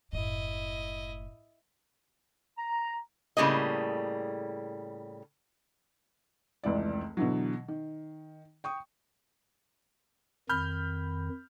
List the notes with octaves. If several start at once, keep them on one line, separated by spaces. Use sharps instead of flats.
F#1 A2 E4 D#5
A#5
A2 C#3 G3 A#3 D#5
F1 C#2 E3 D5
B2 D3 E3 F#3
D#3
G5 C#6 D#6
F2 D#3 B5 F6 G6